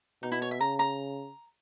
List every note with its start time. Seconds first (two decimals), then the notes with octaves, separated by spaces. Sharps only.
0.23 B2 D#4
0.32 E4
0.42 C#5
0.51 E5
0.60 C#3 A#5
0.79 A#5